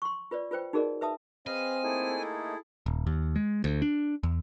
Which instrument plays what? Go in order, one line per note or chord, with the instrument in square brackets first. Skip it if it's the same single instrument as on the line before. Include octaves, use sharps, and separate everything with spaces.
[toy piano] C6 C#6
F4 B4 C#5 D5
F4 B4 C5 G5
D#4 F#4 G#4 A#4 D5 D#5
B4 E5 A5 D#6
[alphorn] C4 [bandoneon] G#4 B4 [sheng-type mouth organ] D#5 F5 [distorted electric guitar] G#5
[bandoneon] A3 A#3 D#4 [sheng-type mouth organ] E4 G#4 A4
[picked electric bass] D#1
D#2
G#3
D2
D4
E2